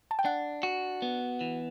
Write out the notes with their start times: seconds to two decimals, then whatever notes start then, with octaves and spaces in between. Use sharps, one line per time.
0.11 A5
0.19 G5
0.25 D4 F#5
0.63 F#4
1.02 B3
1.41 E3